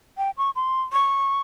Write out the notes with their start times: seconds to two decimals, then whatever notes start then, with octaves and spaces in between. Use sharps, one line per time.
0.17 G5
0.37 C#6
0.55 C6
0.92 C#6